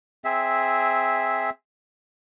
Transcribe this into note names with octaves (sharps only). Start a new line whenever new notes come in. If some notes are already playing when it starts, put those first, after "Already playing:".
C4 G#4 E5